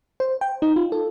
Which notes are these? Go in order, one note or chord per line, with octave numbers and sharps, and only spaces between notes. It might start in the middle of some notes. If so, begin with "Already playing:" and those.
C5
G5
D#4
F4
A4